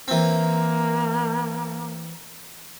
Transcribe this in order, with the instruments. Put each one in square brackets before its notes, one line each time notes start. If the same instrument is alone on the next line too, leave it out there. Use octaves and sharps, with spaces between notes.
[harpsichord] E3 C4 [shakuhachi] A#3